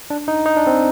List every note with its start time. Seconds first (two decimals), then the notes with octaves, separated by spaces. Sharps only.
0.10 D4
0.28 D#4
0.46 D#4
0.57 D4
0.67 C4